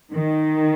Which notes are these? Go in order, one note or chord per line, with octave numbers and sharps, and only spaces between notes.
D#3